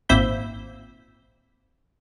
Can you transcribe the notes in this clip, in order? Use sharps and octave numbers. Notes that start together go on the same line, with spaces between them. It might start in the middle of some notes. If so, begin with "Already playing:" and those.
G#1 A#2 C4 E5 B5 G6